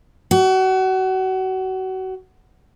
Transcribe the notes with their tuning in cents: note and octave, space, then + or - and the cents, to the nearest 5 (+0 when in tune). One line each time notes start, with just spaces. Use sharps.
F#4 +30